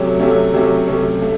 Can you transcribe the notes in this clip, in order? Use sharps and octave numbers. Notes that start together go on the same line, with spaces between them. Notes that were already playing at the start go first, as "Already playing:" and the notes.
Already playing: C3 F#3 A3 C#4
C3 F#3 A3 C#4
C3 F#3 A3 C#4
C3 F#3 A3 C#4
A3